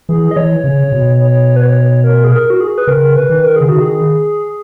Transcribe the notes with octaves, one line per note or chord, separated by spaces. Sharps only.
E3 G#4
D#5
E3 C#5
C#3
B2
C#5
B4
C#5
A#4
G#4
A#4
F#4
G#4
B4
C#3 A#4
B4
D#3
A#4
C#3 G#4
D#3 F#4
G#4